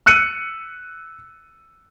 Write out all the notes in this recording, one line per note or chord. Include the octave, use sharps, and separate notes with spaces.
E6 F#6 C#7 D#7